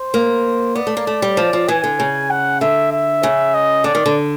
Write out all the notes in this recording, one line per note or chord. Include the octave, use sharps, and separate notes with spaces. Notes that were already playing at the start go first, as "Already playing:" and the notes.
Already playing: C5
A#3
B3 D5
A3
A#3
A3
G3
F3
F3
E3 G#5
D3
C#3
F#5
D3 E5
E5
C#3
D#5
D3 D5
D#3
D3